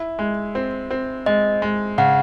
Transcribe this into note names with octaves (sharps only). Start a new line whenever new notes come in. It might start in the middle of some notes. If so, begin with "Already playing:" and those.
Already playing: E4
G#3
C4
C4
G#3 D#5
G#3
C#3 F#5